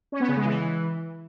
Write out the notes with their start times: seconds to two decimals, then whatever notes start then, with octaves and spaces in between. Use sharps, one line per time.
0.12 C#4
0.20 B3
0.29 C#3
0.37 G#3
0.45 E3